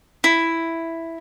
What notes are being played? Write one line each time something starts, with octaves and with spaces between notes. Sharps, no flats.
E4